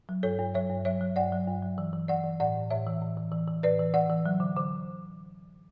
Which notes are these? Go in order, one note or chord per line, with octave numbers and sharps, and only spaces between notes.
F#3
G2 A4 C#5
G2
F#3 C#5 E5
G2
F#3 C#5 E5
F#3
G2 D5 F#5
F#3
G2
F#3
E3
E3
E3 D5 F#5
E3
A2 D5 F#5
A2
A2 C#5 E5
E3
A2
E3
E3
E3
A2 B4 D5
E3
E3 D5 F#5
E3
F#3
D3
D3